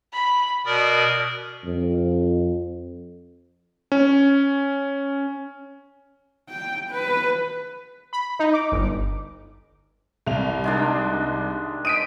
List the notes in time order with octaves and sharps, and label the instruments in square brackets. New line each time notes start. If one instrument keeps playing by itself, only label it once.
[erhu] B5
[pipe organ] B2 A#4 D5 [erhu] D#6
[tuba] F2
[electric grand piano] C#4
[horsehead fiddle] G5
B4
[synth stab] B5
D#4
D6
G1
[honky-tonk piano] C2 F7
[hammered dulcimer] D#3 G#3 D4
[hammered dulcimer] D#5 [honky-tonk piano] B6 D7 D#7